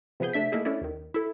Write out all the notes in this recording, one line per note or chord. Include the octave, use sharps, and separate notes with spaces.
C3 F3 B3 G#4 G6
C3 A3 D4 E5 B6
A3 A#3 D#4 E4 G#4
A3 C#4 D4 E4
D#2 D#3
E4 A4